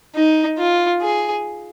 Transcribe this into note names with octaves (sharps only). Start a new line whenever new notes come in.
D#4
F4
G#4